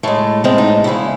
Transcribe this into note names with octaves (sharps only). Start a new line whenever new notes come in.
A2 G#3 A3
A2 G#3 C4
D#4
E2 C#3 G#3 E4